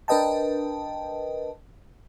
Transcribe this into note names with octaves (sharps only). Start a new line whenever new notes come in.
D4 A#4 B4 D#5 G5 A5